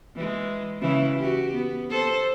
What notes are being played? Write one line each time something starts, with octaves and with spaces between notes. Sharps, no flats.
E3 G#3
C#3 E3 E4
F#4 G4
B3
A4 C5